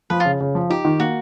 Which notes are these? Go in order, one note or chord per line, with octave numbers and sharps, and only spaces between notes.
F3 B4
F4
C#3
C#3
F3
D#4 G4
D#3
A#3 F#4